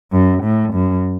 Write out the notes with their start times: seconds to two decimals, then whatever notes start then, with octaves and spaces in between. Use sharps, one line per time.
0.12 F#2
0.43 A2
0.73 F#2